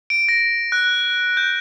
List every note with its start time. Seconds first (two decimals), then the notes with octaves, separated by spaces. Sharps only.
0.10 D7
0.29 A#6
0.72 F#6
1.37 G6